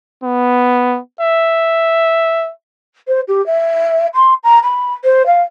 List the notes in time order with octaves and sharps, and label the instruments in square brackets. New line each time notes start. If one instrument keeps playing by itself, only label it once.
[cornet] B3
E5
[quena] C5
G4
E5
C6
A#5
B5
C5
F5